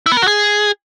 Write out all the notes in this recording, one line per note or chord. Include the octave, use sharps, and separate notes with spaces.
E4
B3
A#4
F#4
G#4